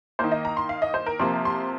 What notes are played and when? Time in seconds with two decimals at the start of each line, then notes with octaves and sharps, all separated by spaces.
0.19 D#3 A#3 C5
0.32 D#5
0.45 A#5
0.57 C6
0.69 F5
0.82 D#5
0.94 C5
1.06 A#4
1.19 C3 F3 A#3 C6
1.45 C6